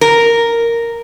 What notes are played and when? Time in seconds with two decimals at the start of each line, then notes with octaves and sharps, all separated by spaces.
0.01 A#4